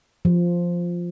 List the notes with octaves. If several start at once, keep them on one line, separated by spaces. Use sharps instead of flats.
F3